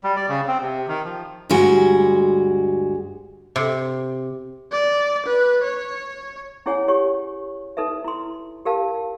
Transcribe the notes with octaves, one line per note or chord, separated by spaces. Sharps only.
G3
D5
C#3
C4
C3
D#3
F3
D2 G2 G3 G#3 F#4
C3
D5
B4
C#5
C#4 E4 G#4 C#5 F#5 G#5
G4 C#5 C#6
D#4 A4 B4 E5
E4 C6
G4 A#4 F5 A5